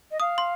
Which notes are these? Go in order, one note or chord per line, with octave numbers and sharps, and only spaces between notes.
D#5
F5 D#6
C6